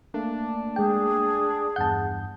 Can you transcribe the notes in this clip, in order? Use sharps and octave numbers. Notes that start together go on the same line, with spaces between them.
A3 A#3 D4
G#3 G#4 G5
E2 G2 F#5 A5 G6